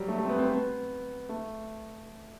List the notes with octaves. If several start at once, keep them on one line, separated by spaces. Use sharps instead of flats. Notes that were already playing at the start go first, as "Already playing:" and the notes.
Already playing: F#3 G3
A3
A3
C4
B3
C4
B3
A3